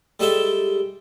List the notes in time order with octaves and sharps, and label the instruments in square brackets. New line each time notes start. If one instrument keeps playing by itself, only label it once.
[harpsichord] G3 G#3 A4 E5 G5